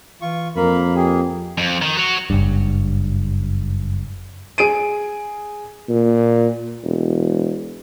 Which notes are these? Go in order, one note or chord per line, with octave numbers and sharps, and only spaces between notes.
E3 F4 C#6
F2 A#3 A#4 F5 B5
A#3 G4 G#4
F2
D#3
F#4 C#5
F#1 G2
G#4 D7 D#7
A#2
E1